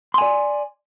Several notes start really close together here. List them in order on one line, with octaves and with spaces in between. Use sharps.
C6 G#5 D5